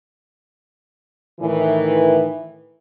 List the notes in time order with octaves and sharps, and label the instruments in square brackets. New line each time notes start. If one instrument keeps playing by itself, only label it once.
[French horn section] A2 D#3 E3